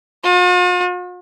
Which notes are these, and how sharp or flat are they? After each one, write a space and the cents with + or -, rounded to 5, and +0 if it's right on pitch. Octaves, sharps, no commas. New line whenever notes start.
F4 +45